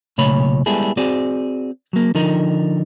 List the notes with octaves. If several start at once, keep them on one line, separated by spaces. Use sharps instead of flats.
B1 A#2 C#3 A3 C#5 B5
G3 G#3 B3 E4 G#4 A4
C4 F#4 G#4 D5
F#3 A#3
D3 F3 D#4 A#4